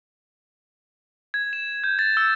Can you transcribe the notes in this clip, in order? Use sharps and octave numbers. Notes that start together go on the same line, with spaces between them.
G#6
E7
G6
A6
E6